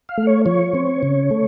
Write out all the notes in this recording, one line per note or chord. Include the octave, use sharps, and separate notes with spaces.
F5
A3
C#5
F3 C#5
C4
C#3
A3